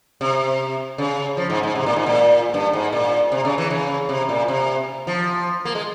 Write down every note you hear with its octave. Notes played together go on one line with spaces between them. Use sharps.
C3
C#3
F3
G#2
G#2
C3
A#2
G#2
A#2
G2
G#2
A#2
C3
C#3
E3
C#3
C3
A#2
C3
F3
A#3
G#3